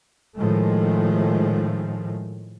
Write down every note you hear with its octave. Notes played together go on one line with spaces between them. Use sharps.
A2 D#3 F3 G#3 A3